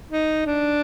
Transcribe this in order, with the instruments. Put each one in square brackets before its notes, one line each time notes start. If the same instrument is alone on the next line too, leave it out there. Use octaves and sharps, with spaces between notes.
[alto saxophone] D#4
D4